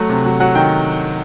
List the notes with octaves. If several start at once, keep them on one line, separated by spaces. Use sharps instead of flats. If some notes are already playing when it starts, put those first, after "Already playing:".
Already playing: F#3 A3 F#5
C3
F#3
F#3 F#5
D#3 G5